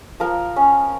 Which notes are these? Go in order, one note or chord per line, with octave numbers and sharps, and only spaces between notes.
F3 A#4
C#4